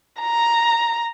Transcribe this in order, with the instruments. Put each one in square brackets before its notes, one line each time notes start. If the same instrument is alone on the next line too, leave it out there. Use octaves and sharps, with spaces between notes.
[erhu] A#5